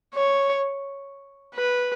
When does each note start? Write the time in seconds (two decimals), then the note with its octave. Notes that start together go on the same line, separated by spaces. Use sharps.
0.14 C#5
1.55 B4